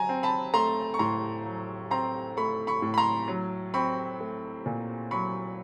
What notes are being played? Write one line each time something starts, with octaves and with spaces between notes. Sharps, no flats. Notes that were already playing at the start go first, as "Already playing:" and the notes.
Already playing: F#3 G#5 A#5
C4
A5 B5
A3 A#5 C6
C#6
A2 A#5 C6
F#3
C4 A#5 C6
A3 B5 C#6
B5 C#6
A2
B5
A#5 C6
F#3
C4 B5 C#6
A3
A#2
F#3 B5 C#6